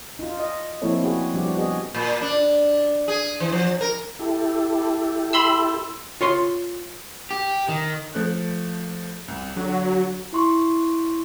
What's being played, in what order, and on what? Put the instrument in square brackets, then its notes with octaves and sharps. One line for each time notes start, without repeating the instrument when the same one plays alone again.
[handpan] D#4 F4
D#5
F3 A#3 C4 E4 A4 C#5
B3 F#4 G#4
F3 G3 D4 F#4 G4
B3 F#4 G#4 D#5
[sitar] A#2
D4
G#4
E3
F3
A#4
[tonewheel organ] E4 G4 A4
[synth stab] B5 C6 E6
[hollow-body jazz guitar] F4 C#5 C6
[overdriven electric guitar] G4
D#3
[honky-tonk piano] F3 A3 F#6
C2
[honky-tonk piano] D3 [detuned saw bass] F#3
[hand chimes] E4 C6 C#6